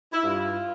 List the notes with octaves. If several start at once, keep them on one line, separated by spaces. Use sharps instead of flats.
E4
G2 F4